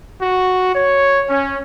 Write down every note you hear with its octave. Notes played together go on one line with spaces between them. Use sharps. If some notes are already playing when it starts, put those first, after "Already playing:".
F#4
C#5
C#4